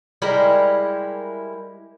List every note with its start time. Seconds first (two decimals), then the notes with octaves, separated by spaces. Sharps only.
0.22 G3 G#3 E4 A#4